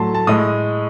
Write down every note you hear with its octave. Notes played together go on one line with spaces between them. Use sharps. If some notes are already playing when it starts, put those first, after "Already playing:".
Already playing: A2 F#3 A3 A5 C6
A5
A2 G#3 D#6